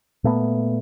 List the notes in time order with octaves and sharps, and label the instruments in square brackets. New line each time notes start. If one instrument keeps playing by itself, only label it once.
[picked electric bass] A#2 A3 B3